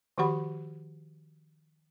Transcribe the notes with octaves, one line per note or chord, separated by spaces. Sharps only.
D#3 F3 F#4 G4 F#5 B5